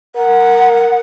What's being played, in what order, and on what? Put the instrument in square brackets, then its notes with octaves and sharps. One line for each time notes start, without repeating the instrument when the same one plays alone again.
[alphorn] A#4 [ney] F#5